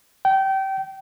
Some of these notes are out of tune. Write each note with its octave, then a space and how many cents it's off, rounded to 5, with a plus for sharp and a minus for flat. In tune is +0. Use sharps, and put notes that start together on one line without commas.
G5 -25